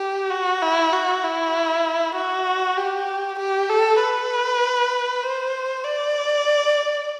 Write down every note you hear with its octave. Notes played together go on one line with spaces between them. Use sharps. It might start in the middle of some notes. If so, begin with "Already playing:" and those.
Already playing: G4
F#4
E4
F#4
E4
F#4
G4
G4
A4
B4
C5
D5